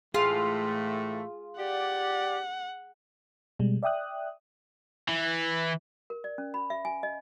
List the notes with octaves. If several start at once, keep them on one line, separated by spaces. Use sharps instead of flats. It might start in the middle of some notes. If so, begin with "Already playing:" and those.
A2 E3 A3 F4 G#4
G4 D5 F#5
B2 G3 G#3
D5 E5 G5 D#6 F#6
E3
A#4
D5
C#4
B5
E5
G#5
D#5